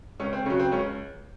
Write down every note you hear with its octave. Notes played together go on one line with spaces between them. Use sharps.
C#2 C#4
C4
C#3 F#3 C#4
C4
C#2 C#4